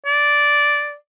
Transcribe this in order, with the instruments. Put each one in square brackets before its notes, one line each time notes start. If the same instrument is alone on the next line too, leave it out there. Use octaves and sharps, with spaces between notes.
[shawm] D5